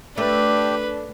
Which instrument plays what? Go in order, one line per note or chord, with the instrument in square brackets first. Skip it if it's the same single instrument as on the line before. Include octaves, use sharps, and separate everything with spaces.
[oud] A3 [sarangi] D4 [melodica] G4 [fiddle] B4